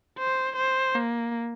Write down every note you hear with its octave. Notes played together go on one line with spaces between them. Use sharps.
C5
C5
A#3